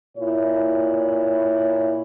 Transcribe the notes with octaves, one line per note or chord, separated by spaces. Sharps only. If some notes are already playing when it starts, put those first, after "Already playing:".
A#2 E4 C#5